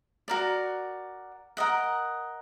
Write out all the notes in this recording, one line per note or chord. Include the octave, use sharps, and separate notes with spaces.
F#4 A#4 D5
A#4 D#5 F#5